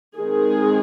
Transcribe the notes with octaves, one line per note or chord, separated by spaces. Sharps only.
D#3 G#3 C4 G#4